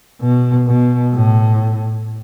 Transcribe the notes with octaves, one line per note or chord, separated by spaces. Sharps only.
B2
B2
A2